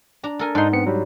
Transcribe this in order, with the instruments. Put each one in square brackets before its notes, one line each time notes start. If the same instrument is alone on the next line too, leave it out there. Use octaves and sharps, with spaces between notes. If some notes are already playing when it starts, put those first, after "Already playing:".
[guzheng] D4 A#5
A4 A#4 G#5
[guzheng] G#2 C6 [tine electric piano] D4 D#4
[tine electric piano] B3 C4 C#7
F#3 G3